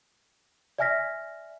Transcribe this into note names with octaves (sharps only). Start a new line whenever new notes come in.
D5 E5 G#5 F6 A#6 B6